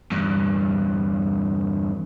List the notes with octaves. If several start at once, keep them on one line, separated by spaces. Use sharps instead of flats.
E2 G2